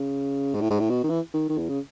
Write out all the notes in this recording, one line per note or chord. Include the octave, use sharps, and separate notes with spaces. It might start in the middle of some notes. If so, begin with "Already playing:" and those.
Already playing: C#3
G#2
A2
G#2
A2
B2
D#3
E3
D#3
D#3
E2
C#3